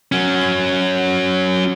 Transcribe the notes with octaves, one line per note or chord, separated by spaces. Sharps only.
F#3 C#4